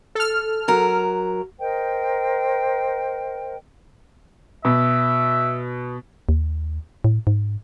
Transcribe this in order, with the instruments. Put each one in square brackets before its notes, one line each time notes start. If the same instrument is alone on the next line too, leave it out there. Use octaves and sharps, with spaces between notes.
[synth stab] A4 F6
[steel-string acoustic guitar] F#3 A#4
[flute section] A#4 C5 D#5 G5
[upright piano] B2 [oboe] E5
[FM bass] D#2
A2
G#2